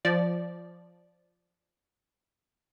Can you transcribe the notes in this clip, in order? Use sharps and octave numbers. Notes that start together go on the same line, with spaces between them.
F3 D5